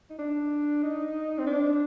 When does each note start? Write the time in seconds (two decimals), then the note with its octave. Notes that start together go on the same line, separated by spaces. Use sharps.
0.10 D#4
0.19 D4
0.83 D#4
1.39 C4
1.46 D4